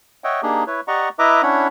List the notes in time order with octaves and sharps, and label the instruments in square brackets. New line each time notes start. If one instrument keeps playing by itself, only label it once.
[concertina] C#5 D#5 E5 F#5 G5
A#3 D4 D#4 G4 G#4
E4 B4 C#5
G4 D5 D#5 F#5 A#5 C#6
E4 B4 D#5 E5 A#5 D6
C#4 D4 E4 C#5 F#5 B5